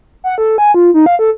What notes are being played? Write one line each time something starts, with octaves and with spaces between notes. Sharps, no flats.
F#5
A4
G#5
F4
D#4
F5
A4